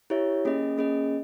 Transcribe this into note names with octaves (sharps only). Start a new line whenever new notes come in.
E4 G4 C#5 E5
A#3 C#4 G#4 D#5
A#3 C#4 G#4 D#5